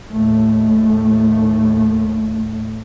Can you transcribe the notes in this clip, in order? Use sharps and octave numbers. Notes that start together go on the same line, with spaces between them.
D#2 A2 A3